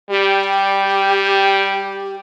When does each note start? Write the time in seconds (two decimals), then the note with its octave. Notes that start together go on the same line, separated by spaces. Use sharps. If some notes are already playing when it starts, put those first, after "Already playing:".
0.10 G3 G4